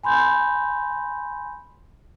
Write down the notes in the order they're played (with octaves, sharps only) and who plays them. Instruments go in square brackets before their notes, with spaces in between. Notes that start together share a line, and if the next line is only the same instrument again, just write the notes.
[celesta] G#5 B5 C6 G6